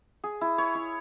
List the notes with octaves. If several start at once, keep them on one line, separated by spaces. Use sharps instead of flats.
G#4
E4
C#5
E4